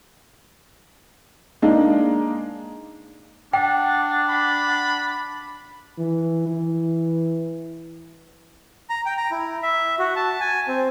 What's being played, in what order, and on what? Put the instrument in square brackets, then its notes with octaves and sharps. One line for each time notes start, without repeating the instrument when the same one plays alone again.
[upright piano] G#3 A#3 D4 D#4
[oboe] D4 [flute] F#5 [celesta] G5
[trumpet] B5
[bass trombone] E3
E3
[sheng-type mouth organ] A#5
G5
A#5
E4
E5
F#4
A5
G#5
C4